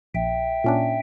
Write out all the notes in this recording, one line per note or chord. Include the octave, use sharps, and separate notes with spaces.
A#1 E5 G5
A#2 C#4 D4